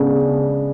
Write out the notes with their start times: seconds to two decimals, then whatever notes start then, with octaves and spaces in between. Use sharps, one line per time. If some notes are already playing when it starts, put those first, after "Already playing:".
Already playing: C#3 G#3 B3 D4